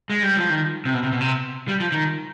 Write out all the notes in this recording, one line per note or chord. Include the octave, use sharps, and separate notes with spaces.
G#3
G3
F3
D#3
C3
B2
C3
B2
C3
G3
F3
D#3